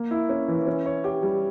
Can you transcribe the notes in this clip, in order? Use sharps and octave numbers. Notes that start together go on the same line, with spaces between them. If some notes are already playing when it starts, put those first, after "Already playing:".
Already playing: A#3
E4
C#4
E3
C#4
C#5
G4
G3